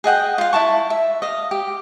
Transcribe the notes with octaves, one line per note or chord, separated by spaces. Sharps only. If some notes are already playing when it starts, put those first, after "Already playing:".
G#4 D#5 F#5 G5
F4 F5
E4 A4 A5 C#6
E5
D#5 F5
G4